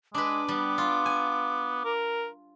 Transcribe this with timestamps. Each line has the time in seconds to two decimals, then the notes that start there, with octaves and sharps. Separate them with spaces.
0.14 G#3 D4 B4 D6
0.48 G3 B3
0.78 F4
1.06 G#5
1.85 A#4